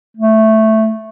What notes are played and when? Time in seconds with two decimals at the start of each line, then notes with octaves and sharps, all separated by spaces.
0.17 A3